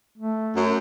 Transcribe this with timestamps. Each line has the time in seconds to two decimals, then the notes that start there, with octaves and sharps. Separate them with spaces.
0.18 A3
0.55 F#2